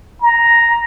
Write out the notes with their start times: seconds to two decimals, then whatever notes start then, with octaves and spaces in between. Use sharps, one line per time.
0.22 A#5